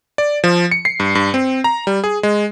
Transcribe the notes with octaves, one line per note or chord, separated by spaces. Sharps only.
D5
F3
C#7
C7
G2
G2
C4
A#5
G3
G#4
G#3